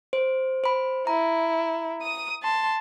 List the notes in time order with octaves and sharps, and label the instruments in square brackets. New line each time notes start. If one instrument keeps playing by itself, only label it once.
[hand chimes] C5
C5 B5
[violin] E4 [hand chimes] A#5
[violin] D#6 D#7
A5 C6